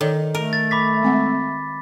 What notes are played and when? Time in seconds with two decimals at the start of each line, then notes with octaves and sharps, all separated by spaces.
0.01 D#3 A4 C#5 D5
0.35 A3 A#4
0.53 A6
0.71 B5 D6 B6
1.03 G#3 C4 F#5